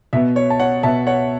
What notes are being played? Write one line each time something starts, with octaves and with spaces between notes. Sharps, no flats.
B2 B3 E5
C#5
A5
C#5 F#5
B2 B3 E5 A5
C#5 F#5